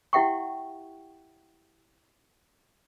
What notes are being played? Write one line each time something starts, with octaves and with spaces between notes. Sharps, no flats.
E4 G4 E5 F#5 G5 C#6